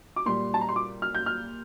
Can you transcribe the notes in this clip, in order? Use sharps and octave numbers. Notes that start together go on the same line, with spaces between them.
D6
A#2 G3 C6
A5
A#5
C6
D6
F6
G6
F6